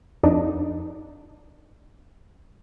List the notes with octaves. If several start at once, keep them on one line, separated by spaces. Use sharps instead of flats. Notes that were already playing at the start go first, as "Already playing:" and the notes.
F2 D4 D#4